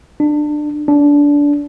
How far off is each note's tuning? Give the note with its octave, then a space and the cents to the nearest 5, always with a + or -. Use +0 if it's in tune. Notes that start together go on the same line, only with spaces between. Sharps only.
D4 +25
D4 -20